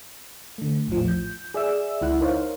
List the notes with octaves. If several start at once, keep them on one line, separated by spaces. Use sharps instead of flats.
D3 A3
A#1 E2 A2 F3
G6
G#4 D5 E5 E6
C#2 E4 F#5 F#6
D#4 A#4 C5 C#5 F5